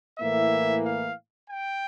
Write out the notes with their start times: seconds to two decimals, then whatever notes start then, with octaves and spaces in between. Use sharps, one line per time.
0.19 A2 E3 A#3 E5
0.84 F5
1.50 G5